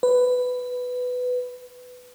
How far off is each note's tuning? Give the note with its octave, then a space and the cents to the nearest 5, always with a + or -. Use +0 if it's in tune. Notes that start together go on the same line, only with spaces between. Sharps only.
B4 +10